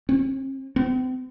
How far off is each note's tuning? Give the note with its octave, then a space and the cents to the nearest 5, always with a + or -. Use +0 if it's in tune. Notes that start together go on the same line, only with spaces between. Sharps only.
C4 +45
C4 -40